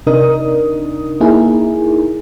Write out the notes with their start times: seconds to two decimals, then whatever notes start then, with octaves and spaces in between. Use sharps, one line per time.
0.07 C3 D4 D#4 A#4 D#6
1.20 A#3 D#4 E4 G#4 A#4